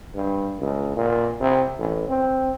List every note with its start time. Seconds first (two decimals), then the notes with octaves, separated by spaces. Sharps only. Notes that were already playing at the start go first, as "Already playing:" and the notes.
0.15 G2
0.59 C#2
0.96 A#2
1.40 C3
1.78 A1
2.08 C4